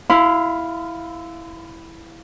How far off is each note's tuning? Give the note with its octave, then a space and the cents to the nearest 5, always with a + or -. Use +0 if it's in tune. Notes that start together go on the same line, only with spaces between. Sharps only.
E4 +0 F5 +0 C6 -40